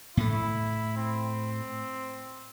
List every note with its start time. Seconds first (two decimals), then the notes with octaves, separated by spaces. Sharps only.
0.17 A2 A3 E4
0.97 C4